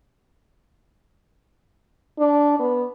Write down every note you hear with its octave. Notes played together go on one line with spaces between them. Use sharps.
D4
B3